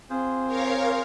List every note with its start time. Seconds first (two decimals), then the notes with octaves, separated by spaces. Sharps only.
0.10 C4 F4 G#4 C5
0.46 A#4 C#5 F5